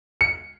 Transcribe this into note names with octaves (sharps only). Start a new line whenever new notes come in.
C#7